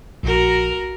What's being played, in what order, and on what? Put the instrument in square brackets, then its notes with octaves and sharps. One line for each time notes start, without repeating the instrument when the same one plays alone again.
[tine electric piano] A#1 [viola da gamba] F#4 A#4